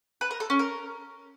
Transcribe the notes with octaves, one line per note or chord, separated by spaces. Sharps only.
B4
A#4
A4
C#4
A#4